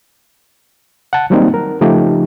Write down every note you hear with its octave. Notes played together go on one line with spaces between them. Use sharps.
F#5 A5
D#3 F#3 G3 A#3 C4 D#4
A#4
C#3 F3 A3 D#4 G4